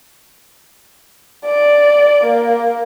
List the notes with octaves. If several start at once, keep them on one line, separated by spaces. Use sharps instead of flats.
D5
A#3